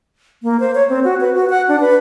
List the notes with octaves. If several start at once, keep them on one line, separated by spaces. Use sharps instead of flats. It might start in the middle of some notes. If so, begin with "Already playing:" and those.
A#3
C5
C#5
C4
F#4
B4
F#4
F#5
D4
B4